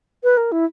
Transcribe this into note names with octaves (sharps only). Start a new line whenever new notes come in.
B4
A#4
E4